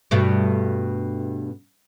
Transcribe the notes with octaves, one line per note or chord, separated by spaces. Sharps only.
G2 B2 A3